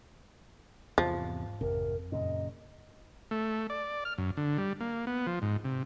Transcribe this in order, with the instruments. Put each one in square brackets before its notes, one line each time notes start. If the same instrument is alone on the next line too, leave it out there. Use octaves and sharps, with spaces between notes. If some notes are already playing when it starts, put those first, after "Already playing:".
[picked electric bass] E2 C3 [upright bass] G#2 [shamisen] F3
[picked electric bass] G#1 C3 [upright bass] F2 [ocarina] A#4
[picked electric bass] F#2 A#2 C#3 [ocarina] D#5
[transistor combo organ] A3
D5
F6
F#2
D3
G3
A#3
B3
F3
G#2
C3